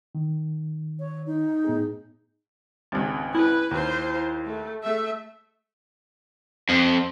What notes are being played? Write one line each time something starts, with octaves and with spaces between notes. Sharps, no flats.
D#3
C#5
D#4
A2 B3 G#4
G#1 C#2
E4 B4
D#2 F4 C5
A3
A3 E5
F2